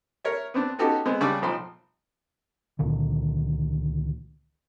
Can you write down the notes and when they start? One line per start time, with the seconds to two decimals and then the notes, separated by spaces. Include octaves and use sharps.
0.25 A#4 C#5 E5
0.54 B3 C4 D4
0.79 B3 C#4 D#4 F#4 G4 A4
1.06 G#3 B3 C4
1.21 C#3 G3 D4 C#6 D6 E6
1.42 B1 F3 B5 C6
2.79 C#2 A#2 D3 D#3